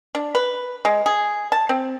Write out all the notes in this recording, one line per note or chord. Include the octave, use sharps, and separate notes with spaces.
D4
B4
G#3
G#4
A5
C4